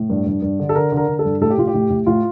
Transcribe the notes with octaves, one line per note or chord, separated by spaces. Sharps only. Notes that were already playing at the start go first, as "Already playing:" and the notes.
Already playing: A2
G2
G2
G2
D3
A4
D3 A#4
D3
A#4
D3
A4
G2
A2 A4
G4
A2 F4
G4
A2
A2
A2 F4